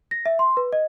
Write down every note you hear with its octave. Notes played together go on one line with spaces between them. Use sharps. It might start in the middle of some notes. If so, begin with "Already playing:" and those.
A#6
E5
C6
B4
D#5